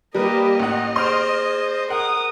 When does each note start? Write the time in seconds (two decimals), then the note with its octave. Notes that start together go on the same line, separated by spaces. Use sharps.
0.15 G3 A#3 G4 A#4 B4 D#5
0.59 A1 F#5
0.96 G#4 C5 C6 F6 D7
1.90 A#4 F#5 D#6